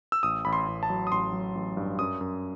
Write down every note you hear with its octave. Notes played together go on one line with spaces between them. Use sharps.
E6
A1 D#6
A1 B5
C6
A1
A5
F#3
D#6
A1 C6
F#3
A1
G2
F#2 D#6
F#2